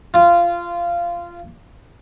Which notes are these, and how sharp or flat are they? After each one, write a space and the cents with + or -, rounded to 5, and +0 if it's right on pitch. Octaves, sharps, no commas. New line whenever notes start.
F4 -15